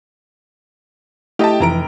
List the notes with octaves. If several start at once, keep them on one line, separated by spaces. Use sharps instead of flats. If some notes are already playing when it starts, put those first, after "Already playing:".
A3 E4 G4 D#5 G5 A5
F1 F2 E3 A#5 D7